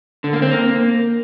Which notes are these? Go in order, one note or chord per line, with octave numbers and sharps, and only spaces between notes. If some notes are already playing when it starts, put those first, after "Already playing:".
D3
A#3
C4
A#3